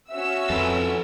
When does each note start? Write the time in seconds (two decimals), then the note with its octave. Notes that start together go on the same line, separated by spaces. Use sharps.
0.10 C#4 F#4 E5 E6
0.50 F2 A4 B4